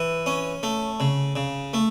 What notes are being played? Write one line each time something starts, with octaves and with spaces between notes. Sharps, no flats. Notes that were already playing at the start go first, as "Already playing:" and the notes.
Already playing: E3
C#4
A3
C#3
C#3
A3